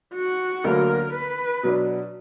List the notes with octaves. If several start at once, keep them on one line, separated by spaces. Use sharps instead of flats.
F#4
D2 D3 F#3 A#3 A#4
B4
B2 F#3 D4